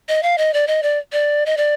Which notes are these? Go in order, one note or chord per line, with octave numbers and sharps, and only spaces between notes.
D#5
F5
D#5
D5
D#5
D5
D5
D#5
D5